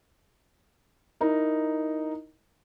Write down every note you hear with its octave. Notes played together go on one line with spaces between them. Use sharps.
D#4 E4 A#4